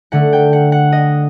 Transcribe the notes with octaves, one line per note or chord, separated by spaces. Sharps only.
D3 A3 F#5
G5
F#5
F#5
D#5